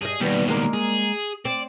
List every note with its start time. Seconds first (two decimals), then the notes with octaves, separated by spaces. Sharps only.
0.02 G2 G#4 D#5
0.20 D#2 B2 G3 B3
0.48 G#3 A#3
0.74 G#4
1.45 C4 D5